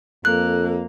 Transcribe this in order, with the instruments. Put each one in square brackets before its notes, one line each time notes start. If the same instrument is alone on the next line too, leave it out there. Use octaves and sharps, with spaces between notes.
[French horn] F2 [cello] A#3 [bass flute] A4 [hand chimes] F#6